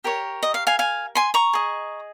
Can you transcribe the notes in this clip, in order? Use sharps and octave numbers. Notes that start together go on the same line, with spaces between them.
G4 A#4 C#5
D#5
F5
F5 G#5
F5 G#5
G#5 C6
A#5 C#6
G#4 D#5